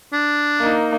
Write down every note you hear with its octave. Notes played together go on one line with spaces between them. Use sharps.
D4
A#3 D#4